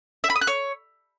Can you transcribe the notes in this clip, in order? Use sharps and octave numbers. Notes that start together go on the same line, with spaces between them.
E5
B5
D#6
F#6
C#5